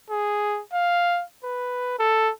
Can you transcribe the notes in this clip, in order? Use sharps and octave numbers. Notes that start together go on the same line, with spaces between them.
G#4
F5
B4
A4